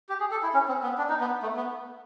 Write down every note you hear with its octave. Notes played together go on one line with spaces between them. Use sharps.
G4
G#4
A4
E4
C#4
C4
B3
D4
D#4
B3
A3
B3